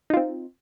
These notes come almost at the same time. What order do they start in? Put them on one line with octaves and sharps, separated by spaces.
D#4 F4 C4